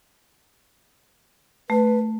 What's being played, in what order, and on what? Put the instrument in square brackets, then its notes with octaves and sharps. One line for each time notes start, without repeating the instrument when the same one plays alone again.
[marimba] A3 [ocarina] B4